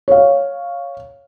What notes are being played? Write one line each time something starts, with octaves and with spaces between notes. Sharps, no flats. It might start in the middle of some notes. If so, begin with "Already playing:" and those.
C#5 F5